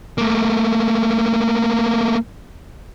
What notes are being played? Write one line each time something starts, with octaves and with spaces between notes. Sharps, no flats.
A3 A#3